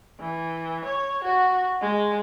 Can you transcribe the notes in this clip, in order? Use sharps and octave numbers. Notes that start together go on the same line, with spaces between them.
E3
C#5
F#4
G#3